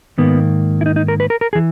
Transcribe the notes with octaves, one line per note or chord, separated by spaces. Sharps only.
G#2 D#3 A#3 B3
E4
D#4
D#4
A#4
B4
A#4
A#4
E3 G#4